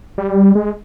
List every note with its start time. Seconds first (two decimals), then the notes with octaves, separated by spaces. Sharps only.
0.18 G3
0.55 G#3